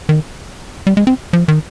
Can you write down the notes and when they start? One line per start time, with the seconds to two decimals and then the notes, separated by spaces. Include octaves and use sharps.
0.09 D#3
0.87 G3
0.97 G#3
1.07 C4
1.33 F3
1.48 D#3